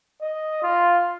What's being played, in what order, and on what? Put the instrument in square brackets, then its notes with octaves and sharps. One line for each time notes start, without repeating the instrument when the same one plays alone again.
[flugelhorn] D#5
F4